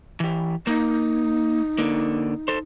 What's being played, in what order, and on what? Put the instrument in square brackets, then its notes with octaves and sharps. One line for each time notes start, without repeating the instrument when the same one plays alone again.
[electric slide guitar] E3 G4
[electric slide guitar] A#3 [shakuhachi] D#4
[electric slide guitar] D3 A#3
A4 C5